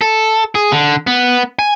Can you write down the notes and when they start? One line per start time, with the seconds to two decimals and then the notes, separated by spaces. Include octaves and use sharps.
0.01 A4
0.55 G#4
0.72 D3
1.07 B3
1.59 G#5